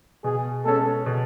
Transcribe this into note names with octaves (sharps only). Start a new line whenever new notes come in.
B2 G#4
G#3 C#4 A4
B2